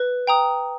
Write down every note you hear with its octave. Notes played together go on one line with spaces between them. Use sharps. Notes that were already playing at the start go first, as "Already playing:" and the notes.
Already playing: B4
G5 A#5 D#6